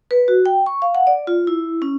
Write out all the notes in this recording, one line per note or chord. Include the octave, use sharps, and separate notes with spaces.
B4
F#4
G5
C#6
F5
F#5
D5
F4
E4
C#4